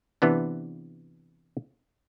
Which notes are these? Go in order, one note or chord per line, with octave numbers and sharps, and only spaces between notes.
C3 E3 B3 D4